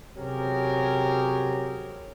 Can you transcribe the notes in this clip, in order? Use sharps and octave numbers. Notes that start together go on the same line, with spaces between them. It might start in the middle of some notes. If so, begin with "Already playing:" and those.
C3 F#3 C#4 G4 G#4 A#4